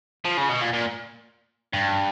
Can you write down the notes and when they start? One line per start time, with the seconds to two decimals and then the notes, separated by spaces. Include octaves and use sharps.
0.25 F3
0.37 C#3
0.49 B2
0.61 A#2
0.73 A#2
1.73 G2